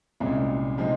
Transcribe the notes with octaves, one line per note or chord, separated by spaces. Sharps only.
C2 A#2 G#3 C#4
C3 F3 G#3 D#4